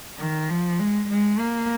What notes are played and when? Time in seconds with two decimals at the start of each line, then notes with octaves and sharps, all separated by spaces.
0.18 D#3
0.49 F3
0.79 G#3
1.09 G#3
1.39 A#3